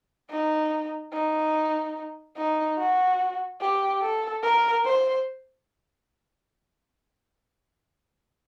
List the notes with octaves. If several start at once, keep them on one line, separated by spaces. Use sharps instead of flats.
D#4
D#4
D#4
F#4
G4
A4
A#4
C5